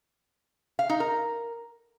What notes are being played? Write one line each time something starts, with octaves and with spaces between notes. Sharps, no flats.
F5
D#4
A#4